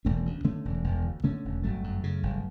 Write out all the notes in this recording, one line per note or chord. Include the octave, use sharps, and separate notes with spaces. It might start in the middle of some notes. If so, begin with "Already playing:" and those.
E1 A3 C#4
D2
D3 A3 C#4
E1
E1
D2
D3 A3 C#4
E1
G1 F#3 A3
F#2
C#3
G1